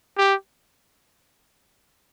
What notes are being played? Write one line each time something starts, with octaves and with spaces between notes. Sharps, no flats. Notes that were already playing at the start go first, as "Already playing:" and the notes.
G4